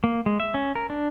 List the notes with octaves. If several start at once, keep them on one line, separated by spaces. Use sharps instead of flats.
A#3
G#3
E5
C#4
A#4
D4